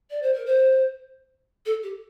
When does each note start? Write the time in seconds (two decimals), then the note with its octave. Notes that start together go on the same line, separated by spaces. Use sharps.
0.10 D5
0.22 C5
0.34 A#4
0.46 C5
1.66 A4
1.83 G4